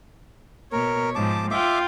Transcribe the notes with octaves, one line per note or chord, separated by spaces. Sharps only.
B2 A#4 C#5
G#2 F3 A5 D6
F4 E5 G5 D6